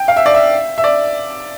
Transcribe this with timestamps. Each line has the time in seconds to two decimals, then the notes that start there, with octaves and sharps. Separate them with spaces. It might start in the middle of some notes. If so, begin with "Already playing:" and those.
Already playing: G5
0.08 F5
0.16 E5
0.26 D5
0.34 E5
0.78 E5
0.84 D5